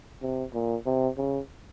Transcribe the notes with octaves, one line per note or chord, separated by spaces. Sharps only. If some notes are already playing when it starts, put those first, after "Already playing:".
C3
A#2
C3
C#3